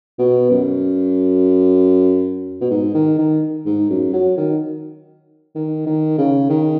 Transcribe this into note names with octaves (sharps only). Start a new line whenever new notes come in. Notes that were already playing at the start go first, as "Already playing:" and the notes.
B2
F#2
B2
G#2
D#3
D#3
G#2
F#2
F#3
D#3
D#3
D#3
C#3
D#3